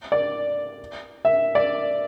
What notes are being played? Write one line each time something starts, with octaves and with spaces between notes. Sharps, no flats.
D5
E5
D5